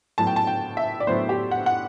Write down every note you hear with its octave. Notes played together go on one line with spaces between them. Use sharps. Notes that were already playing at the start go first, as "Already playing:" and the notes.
A2 F#3 B3 A5
G5
A5
G5
E5
D5
A2 F#3 B3 C5
G4
F#5
F#5